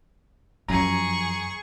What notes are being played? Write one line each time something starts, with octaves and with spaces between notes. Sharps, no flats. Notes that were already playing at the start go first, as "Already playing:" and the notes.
F#2 F3 G#4 A#5 C#6